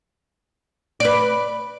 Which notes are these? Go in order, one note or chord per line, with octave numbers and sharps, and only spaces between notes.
B4 D5